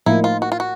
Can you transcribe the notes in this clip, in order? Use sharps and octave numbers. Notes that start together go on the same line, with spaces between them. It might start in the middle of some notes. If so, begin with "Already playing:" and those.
A2 F3 A#3 D#4 E4
F4
F#4
F4
F#4